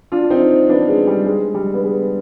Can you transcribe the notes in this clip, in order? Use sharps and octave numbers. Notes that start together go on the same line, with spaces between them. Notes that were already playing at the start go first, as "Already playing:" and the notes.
D4 F4
C4 D#4
B3 D4
G#3
G3
G#3
G3
B3
G#3